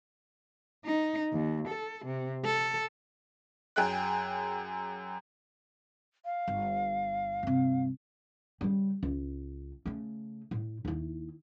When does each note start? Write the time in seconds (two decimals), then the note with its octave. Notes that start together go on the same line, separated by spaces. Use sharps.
0.85 D#4
1.33 D#2
1.68 A4
2.05 C3
2.45 A4
3.76 F#2 G#4 G5 F#6
6.25 F5
6.48 G1
7.43 G2 C3
8.61 C#3 G3
9.03 C#2
9.86 C#3 A3
10.51 A2
10.85 D#2 E4